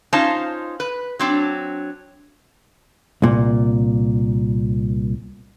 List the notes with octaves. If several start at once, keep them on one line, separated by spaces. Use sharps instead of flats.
C#4 D#4 F4 C5 F5 A5
B4
F#3 C4 D4
C2 A#2